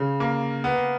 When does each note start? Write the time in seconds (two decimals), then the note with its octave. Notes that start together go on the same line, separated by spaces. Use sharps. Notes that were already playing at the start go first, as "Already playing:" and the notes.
Already playing: C#3
0.20 A#3
0.64 B3